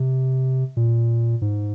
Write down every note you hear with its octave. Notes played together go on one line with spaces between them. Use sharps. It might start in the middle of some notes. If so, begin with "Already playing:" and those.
Already playing: C3
A#2
G#2